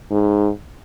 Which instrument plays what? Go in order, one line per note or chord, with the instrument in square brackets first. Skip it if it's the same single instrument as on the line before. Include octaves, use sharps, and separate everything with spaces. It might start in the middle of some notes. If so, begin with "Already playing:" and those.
[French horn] G#2